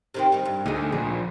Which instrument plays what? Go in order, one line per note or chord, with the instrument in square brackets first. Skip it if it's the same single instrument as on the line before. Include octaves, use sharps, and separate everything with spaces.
[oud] C3 D#3 C4
D#3 G3
G2
[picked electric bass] D2 [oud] D#4 G#4
[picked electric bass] A#1 [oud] G#4